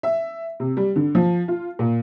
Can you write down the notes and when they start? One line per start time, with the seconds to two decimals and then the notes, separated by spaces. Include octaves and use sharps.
0.03 E5
0.60 C3
0.77 G3
0.96 D3
1.15 F3
1.48 F4
1.79 A#2